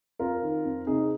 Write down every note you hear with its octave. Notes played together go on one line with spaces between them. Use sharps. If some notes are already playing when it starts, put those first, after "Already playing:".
F2 F4 A#4
D#3
F2
C3 D#4 G#4